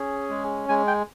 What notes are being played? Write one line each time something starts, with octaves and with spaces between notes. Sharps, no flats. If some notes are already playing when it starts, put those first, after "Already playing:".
Already playing: C#4 G#4
G#3
G#3 G#5
G5